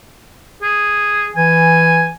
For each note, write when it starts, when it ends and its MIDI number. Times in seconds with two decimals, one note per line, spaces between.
0.63 1.30 68
1.36 2.11 52
1.36 2.14 80